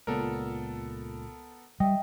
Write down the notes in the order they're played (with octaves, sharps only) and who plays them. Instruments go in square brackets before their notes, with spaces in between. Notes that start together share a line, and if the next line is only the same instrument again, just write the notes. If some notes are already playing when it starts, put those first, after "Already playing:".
[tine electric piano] C#2 A#2 [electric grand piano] B3 A4 A#4
[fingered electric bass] G3 [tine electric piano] D#5 E5 [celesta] G5